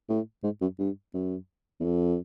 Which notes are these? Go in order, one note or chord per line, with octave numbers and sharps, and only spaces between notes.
A2
G#2
F#2
G2
F#2
E2
F2